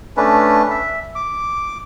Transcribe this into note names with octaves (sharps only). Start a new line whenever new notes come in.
A3 C#4 D4 B4
E5
D6